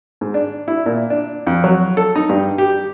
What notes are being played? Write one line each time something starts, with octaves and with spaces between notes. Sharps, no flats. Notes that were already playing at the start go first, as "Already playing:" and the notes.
G#2
D4
E4
A#2
D4
F2
F#3
A4
D#4
G2
G4